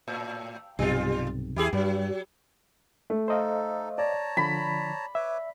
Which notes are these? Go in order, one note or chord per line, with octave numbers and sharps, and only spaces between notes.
A2
B1 G2 C3 G3 F4
E2 E4 G4 G#4
G2 F#3
A3
D#4 A4 C5 D#5 F5
C#5 D5 A5 A#5
D3 F3 B5
B4 C#5 E5 D6